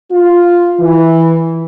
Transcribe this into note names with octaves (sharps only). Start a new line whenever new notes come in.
F4
E3